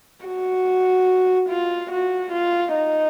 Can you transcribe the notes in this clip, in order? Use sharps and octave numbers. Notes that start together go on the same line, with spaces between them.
F#4
F4
F#4
F4
D#4